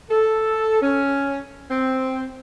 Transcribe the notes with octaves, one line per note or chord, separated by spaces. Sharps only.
A4
C#4
C4